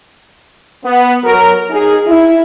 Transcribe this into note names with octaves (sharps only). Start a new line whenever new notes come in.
B3
F#3 A#4
D#4 G#4
E4